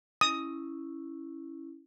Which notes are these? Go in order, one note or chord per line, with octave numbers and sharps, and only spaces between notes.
C#4 E4 D#6